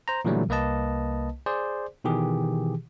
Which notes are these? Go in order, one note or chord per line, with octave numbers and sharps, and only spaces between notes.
C5 A#5
A#2 D3 E3 F#3 G3 A3
C2 A#3 B4 D#5 A5
G#4 C5 D5
B2 D#3 E3 G4 G#4